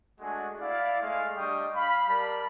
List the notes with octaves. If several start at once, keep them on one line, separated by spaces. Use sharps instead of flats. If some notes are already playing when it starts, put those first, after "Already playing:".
G#3 A3 D4 F#4 G#4
E4 D5 F5
G#3 A3 F5
G3 D4 D#5 G5 C#6 D#6
F5 B5
G3 A#4 D5 A5 B5